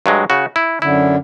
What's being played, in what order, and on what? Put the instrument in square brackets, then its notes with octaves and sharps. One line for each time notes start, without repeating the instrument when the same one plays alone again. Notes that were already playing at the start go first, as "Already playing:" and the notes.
[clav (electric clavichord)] G2 F#3 G#3
C#3 F#4
E4
[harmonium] F#2 D3 [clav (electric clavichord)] E4